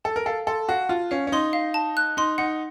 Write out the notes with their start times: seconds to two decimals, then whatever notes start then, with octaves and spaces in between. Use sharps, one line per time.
0.04 A4 A5
0.16 A#4
0.26 A4 F5
0.47 A4 C6
0.69 F#4 F5
0.89 F4 A5
1.11 C#4 F5
1.27 C#4
1.32 D#4 C6
1.53 F5
1.74 A5
1.97 F#6
2.17 D#4 C6
2.38 D#4 F#5